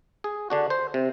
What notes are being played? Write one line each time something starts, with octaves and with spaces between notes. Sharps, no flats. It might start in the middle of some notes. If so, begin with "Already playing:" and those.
G#4
D3 D4 F#4
C5
C3